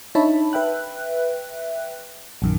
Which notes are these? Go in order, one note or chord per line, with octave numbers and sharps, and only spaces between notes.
D4 D#4 C#5 E5 A5 B5
B4 E5 G5 F#6
A#1 F#2 D#3